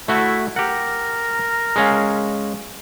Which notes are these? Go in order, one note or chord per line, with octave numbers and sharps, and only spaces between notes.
A3 E4 F#4
G4 A#4 F#5
G#3 C#4 F5